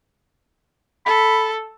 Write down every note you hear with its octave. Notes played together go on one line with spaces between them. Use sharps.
A4 B5